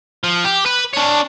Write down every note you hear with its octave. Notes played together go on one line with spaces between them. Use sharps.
F3
G4
B4
D4 C#5